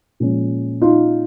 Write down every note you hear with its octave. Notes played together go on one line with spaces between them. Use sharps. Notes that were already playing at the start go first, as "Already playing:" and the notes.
A#2 F3 G#3 C#4
D#4 F4